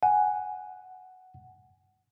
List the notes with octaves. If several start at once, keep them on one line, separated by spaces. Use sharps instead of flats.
F#5 G#5